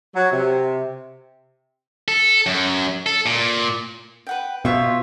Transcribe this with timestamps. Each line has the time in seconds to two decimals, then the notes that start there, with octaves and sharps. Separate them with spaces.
0.15 F#3
0.32 C3
2.08 A4
2.46 F#2
3.06 A4
3.26 A#2
4.27 B4 F#5 G5
4.65 B2 F4 C5 C#5 E5